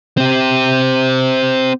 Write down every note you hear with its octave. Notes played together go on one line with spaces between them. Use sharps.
C4 G4